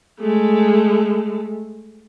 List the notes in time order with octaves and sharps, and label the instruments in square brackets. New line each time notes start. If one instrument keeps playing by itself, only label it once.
[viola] G#3 A3